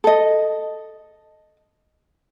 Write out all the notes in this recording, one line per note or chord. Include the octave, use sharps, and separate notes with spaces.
A4 D#5